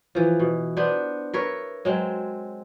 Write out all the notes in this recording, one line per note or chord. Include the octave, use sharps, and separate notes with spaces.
E3 F3
B2
B3 D4 B4 C5
A#4 B4 C#5 E5
F#3 G#3 C4